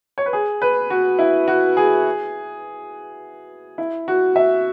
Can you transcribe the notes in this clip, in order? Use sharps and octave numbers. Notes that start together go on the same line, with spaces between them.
C#5
B4
G#4
B4
F#4
E4
F#4
G#4
E4
F#4
E5